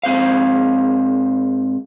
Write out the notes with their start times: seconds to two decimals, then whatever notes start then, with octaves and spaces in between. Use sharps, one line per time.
0.03 G#2 C4 C5 F5